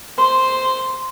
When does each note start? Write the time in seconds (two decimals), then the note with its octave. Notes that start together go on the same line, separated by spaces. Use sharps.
0.18 C5 C6